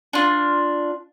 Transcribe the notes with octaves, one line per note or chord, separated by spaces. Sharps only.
D4 F4